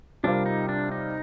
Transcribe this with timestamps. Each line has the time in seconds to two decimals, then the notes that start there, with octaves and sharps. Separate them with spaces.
0.23 C3 G3 C4 D4 F4 A#4
0.46 D#4
0.69 D4
0.92 D#4